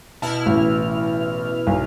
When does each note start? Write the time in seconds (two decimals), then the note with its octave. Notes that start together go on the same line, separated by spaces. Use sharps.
0.22 B2 E4 A5 F6
0.46 A1
1.67 B1